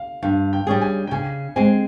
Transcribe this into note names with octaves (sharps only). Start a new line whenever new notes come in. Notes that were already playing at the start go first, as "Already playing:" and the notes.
Already playing: F5
G2 F5
G5
G3 C#4 G#4
G#5
G5
C#3 G#5
G#3 C4 G#5